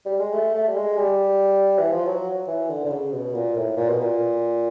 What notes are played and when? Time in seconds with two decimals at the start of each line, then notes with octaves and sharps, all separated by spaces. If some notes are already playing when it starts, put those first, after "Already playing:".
0.06 G3
0.20 G#3
0.33 A3
0.55 A3
0.68 G3
0.76 G#3
0.98 G3
1.79 E3
1.92 F3
2.06 F#3
2.48 E3
2.70 D3
2.86 D3
2.91 C#3
3.13 B2
3.35 A#2
3.56 A2
3.77 A#2
3.90 B2
4.01 A#2